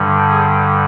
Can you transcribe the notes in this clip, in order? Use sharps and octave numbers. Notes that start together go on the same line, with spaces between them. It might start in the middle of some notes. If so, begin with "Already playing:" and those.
Already playing: G2 D3 G3
G#4